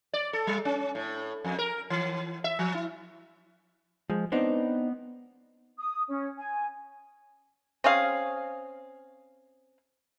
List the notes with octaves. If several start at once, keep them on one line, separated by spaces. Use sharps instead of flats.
D5
A4
G3
C#4
A2
F2
A#4
E3
E5
F3
E4
F3 G#3
B3 C4 D4 D#4
D#6
C#4
G#5
C4 C#4 G#4 F5